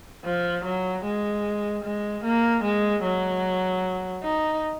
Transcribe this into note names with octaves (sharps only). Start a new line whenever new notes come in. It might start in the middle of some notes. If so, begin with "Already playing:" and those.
F3
F#3
G#3
G#3
A#3
G#3
F#3
D#4